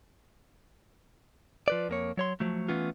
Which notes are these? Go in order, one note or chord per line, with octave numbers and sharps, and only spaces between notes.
F3 B4 D5
F2 A#3 C#5
F#3 C#5 C6
F3 F#3 A3
E3 A3 B3 C#4 F4